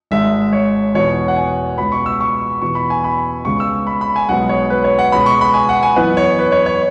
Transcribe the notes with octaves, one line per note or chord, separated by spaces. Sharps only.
G#1 G#2 G#3 E5
C#5
E2 B2 B3 C#5
F#5
G#5
C#2 B2 B3 B5
C#6
E6
C#6
E2 B2 B3 C#6
B5
G#5
B5
C#2 C#3 G#3 B3 C#6
E6
B5
B5
G#5
B1 B2 G#3 B3 F#5
C#5
B4
C#5
F#5
C#2 B2 G#3 B3 B5
C#6
B5
G#5
F#5
G#5
F#2 E3 B3 B4
C#5
B4
C#5
C#5